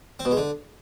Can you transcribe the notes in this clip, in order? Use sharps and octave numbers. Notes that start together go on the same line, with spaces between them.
C4
B2
G#3
D3